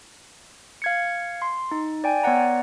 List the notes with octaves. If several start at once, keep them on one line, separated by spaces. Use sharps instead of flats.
F5 G#6 C#7
C6 C7
D#4
D5 G5 G#5
B3 C#5 D5 F#5 A#5